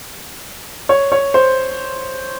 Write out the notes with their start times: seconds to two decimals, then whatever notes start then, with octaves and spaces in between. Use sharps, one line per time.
0.89 C#5
1.12 C#5
1.34 C5